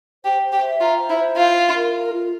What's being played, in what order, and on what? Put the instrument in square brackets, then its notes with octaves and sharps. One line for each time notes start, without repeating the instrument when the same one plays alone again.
[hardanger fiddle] G4 [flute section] C5
[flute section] C5
[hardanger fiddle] G4
[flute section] E5
[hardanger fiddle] F4 [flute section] A#5
[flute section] C5
[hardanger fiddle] E4
[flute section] C5
[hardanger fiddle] F4 [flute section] F5
[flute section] F5
A#4
A#4
F4